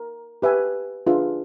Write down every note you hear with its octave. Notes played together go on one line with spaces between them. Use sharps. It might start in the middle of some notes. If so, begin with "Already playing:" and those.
Already playing: A#4
G4 B4 E5 G#5
D4 F4 G#4 B4 E5